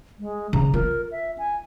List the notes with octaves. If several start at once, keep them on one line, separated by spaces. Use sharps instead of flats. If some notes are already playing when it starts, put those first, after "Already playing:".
G#3
C#3 A#5
F4 A#4
E5
G#5